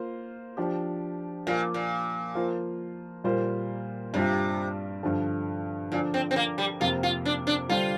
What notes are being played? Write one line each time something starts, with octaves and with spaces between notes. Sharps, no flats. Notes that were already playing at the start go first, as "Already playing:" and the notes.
Already playing: A#3 F4 C5
F3 D4 G4
A#2 F3 A#3 F4
A#2
F3 A#3 F4 C5
A#2 G3 A#3 F4 C5
G2 C3 G3 D4 F4
G2 D3 F3
A#2 D3 F3 D4
C4
C4
A#3
G3
F2 C3 A#3 F4 G4 A#4
F4
D4
D4
D3 G3 D4 F4 G4 C5